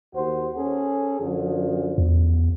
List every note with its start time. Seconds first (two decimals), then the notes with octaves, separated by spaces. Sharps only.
0.14 D#2 F#4 C5
0.55 C#4 G#4 A4
1.20 F#2 D3 F3
1.98 E2